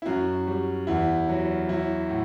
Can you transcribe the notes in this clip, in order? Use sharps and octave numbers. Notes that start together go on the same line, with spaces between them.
E4
F#2 F#4
G3
E2 E4
F#3
F#3 E4
A2